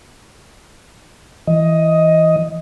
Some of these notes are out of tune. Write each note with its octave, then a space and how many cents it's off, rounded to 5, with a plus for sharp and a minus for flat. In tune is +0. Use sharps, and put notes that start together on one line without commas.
E3 -5 D#5 +10